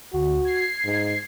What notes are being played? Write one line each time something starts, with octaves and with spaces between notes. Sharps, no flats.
D2 F#4
G#6 C7
G#2